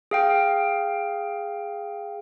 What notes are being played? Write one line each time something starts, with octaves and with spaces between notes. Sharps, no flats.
G#4 F5 G5